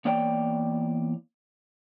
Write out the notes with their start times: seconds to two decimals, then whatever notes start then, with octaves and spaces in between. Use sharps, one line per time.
0.05 E2 A#3 C#5 D5 G5